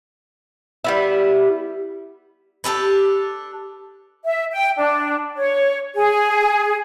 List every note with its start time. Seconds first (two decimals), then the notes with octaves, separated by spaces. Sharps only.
0.84 G3 B3 E4
2.64 D4 G4 A4 B4
4.25 E5
4.52 G5
4.77 D4
5.37 C#5
5.95 G#4